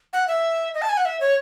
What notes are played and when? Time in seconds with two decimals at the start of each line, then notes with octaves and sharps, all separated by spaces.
0.13 F#5
0.28 E5
0.74 D#5
0.82 A5
0.89 G#5
0.97 F#5
1.05 E5
1.21 C#5